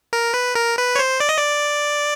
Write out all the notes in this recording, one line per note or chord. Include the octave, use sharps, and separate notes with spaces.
A#4
B4
A#4
B4
C#5
C5
D5
D#5
D5